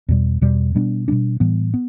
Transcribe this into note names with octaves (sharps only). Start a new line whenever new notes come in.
E2 B2 G3
E2 B2 G3
B2 G3 B3 D4
B2 G3 B3 D4
A2 E3 G3 B3
B3